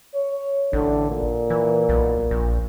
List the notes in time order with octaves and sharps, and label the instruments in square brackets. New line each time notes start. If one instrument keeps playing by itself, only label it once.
[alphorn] C#5
[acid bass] A1 [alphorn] D3
[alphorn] A#2
[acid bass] E3
B1
A#1